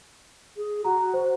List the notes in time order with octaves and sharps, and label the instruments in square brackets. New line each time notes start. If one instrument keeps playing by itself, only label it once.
[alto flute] G#4
[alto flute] F#4 [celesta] A#5
[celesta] C5